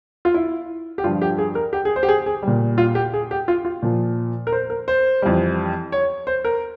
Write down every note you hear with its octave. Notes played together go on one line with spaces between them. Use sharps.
F4
E4
G4
G2 F3 F4
G4
G#4
A#4
G4
G#4
C5
G4
G#4
G#4
A#2 G3
F4
G4
G#4
G4
F4
F4
A#2 F3
A#4
C5
A#4
C5
F2 E3 G3
C#5
C5
A#4